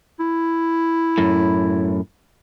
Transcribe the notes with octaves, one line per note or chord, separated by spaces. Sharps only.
E4
F#2 A2